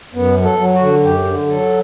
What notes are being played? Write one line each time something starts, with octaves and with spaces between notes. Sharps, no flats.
F#2 B3
F#3
A4
F#3
F#4
D3
F#2 G4
D3
F#3 A4